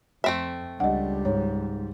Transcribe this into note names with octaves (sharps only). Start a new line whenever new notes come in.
F2 A3 C4 E5
C#2 G3 D4 G4 D#5 F#5
G#2 C#5